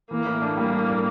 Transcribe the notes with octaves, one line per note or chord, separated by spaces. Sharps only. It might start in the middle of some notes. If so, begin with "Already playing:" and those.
E3 A#3
A2
D4
G3 A#3
A2
D4